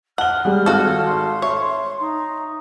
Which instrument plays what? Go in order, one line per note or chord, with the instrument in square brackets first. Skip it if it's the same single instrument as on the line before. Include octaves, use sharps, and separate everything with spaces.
[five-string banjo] F#5 [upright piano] A5 G7 [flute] F6
[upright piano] G3 G#3
[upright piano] G#1 [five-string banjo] F#4 A4
[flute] C6
[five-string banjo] C#5 [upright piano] E5
[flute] D#4